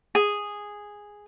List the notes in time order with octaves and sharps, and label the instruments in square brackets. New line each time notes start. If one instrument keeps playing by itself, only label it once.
[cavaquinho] G#4